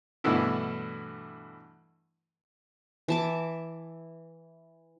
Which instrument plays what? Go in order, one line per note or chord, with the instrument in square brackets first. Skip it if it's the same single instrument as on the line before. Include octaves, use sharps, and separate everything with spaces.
[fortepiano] G2 B2 D3 E3 A3 E4
[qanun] E3 A5 D6